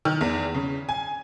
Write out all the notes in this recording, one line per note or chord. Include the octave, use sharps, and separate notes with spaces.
D#3
E2
C#3
G#5